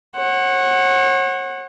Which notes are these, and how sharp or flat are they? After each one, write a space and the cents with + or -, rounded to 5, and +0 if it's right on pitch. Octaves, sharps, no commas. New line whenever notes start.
C#5 -40 F#5 +0